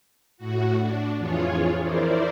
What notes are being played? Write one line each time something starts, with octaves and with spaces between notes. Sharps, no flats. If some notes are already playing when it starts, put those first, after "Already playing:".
A2 F#4
D4
F2 E3 F4 G#4 C#5
E4 A#4 C5 D5